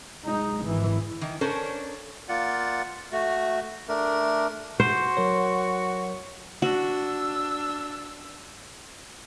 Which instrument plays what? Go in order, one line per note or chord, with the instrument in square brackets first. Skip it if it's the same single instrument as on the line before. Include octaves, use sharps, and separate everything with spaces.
[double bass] G#3 D#4
G#1 E3
[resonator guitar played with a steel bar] D#3 E3
C#4 D4 A4 A#4 C5 C#5
[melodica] A#3 F4 D5 F#5
A3 F#4
A3 D4 A#4
[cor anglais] F#4 [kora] C5
[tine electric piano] F#3 A#4 C#5
[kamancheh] D4 E6 [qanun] F#4